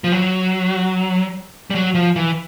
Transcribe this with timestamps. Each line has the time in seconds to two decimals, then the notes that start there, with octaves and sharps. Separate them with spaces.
0.04 F3
0.12 F#3
1.70 G3
1.75 F#3
1.95 F3
2.16 E3